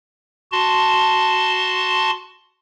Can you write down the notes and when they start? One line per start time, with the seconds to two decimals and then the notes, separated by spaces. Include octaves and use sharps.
0.52 F#4 A5 C6